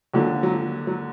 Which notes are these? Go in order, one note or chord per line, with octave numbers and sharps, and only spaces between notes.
D#2 D3 F3 F#3
F#3
F3
F#3